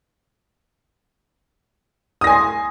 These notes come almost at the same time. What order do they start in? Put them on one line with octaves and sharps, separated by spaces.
D#6 A#6 G#5 C6